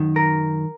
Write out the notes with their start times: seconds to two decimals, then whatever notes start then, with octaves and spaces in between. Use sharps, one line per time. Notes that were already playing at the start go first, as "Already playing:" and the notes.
Already playing: F#2 D#3
0.16 A#4